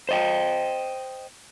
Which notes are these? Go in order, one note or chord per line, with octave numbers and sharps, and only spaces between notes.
C5 D#5 G5